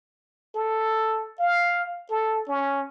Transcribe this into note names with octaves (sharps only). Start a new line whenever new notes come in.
A4
F5
A4
C#4